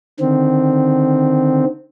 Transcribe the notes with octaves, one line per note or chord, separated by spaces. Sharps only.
D3 D#3 C4